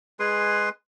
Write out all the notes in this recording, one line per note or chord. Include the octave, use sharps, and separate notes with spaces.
G#3 G#4 B4 C6